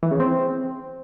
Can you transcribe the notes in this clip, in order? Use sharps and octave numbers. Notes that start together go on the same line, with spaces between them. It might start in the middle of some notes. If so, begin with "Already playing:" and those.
E3
C#3
C4